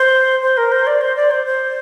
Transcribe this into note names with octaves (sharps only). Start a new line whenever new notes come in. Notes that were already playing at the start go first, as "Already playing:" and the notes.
Already playing: C5
C5
A#4
C5
D5
C5
D5
C5
C5